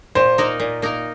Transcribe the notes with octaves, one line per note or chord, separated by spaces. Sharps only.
A#2 C5
A#3 D#4 A#4
A#2
A#3 D#4 A#4